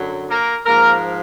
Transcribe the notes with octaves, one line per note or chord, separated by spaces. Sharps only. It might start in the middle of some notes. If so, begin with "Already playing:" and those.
Already playing: F#2 D3 F#3
A#3 A#4
G#2 F3 A#3 A#4